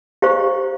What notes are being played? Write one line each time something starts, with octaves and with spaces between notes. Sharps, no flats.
G4 C5 F5 A#5 C#6